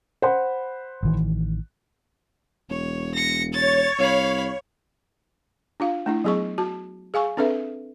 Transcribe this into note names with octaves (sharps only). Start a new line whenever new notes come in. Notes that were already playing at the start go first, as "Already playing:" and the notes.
C5 F#5 B5
A1 D#3 E3
E1 C#5
A#6 C#7
C#5 A6
C2 F5 B5
D4 F4 F5
A3 D4 E4
F#3 B3 G#4 D#5 C#6
F#4 A5
G#4 F5 G#5 C#6
C4 D4 A4 B4 E5